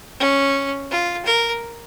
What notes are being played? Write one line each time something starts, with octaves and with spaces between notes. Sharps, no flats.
C#4
F4
A#4